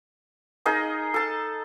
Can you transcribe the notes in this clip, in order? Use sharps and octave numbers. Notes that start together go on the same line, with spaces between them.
D#4 G#4 A#4 D#5
A4 A5